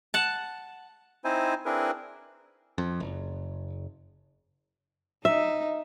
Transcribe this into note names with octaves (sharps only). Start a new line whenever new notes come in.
F#5 A5
C4 D#4 E4 C5 G#5
C4 D4 E4 G#4 A#4 B4
F2
F#1
D#4 E5